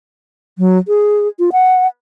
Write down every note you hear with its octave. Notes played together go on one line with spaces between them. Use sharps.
F#3
G#4
F4
F#5